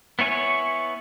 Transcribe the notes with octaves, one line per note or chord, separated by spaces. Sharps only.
B3 E4 C#5 G#5